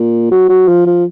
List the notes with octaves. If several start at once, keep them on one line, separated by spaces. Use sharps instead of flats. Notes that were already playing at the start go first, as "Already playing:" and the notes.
Already playing: A#2
F#3
F#3
F3
F3